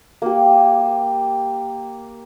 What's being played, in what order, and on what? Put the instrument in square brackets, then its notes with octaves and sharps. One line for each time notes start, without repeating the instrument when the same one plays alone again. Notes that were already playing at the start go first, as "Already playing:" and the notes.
[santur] A#3 G4